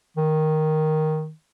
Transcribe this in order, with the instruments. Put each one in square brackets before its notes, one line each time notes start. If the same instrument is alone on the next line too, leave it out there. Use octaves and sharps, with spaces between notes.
[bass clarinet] D#3